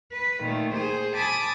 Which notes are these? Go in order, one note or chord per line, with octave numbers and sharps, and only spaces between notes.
B4
A#2 D#3 A3
G#4 C5
G#5 A5 B5 D6 D#6